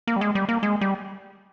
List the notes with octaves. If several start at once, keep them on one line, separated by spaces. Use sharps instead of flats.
A#3
G3
G#3
G3
A#3
G#3
G3